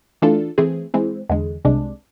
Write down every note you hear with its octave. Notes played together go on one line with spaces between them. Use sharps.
E3 A3 D4 F4 A4
E3 A3 C4 G#4
E3 G#3 C4
E2 D3 G#3
C2 C3 G#3 D4